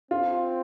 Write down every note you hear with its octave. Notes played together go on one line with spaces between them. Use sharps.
C4 F4